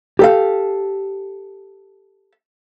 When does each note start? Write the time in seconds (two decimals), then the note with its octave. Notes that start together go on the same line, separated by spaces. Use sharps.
0.19 G4 A4 F5